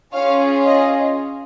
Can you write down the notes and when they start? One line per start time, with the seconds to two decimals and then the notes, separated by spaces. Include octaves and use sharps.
0.13 C#4 F4 G#4 C#5 F5
0.66 D#5